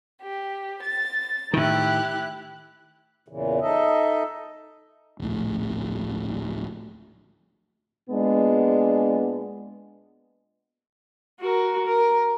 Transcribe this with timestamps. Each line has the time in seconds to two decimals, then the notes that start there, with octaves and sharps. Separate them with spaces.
0.22 G4
0.82 A6
1.53 A2 D#3 E4 G4 F#6
3.28 E2 A#2 C#3 E3
3.61 D#4 A4 D#5 E5
5.20 D1 A#1 A2
8.10 A#2 G#3 B3 D4
11.40 F#4 A#4
11.87 A#4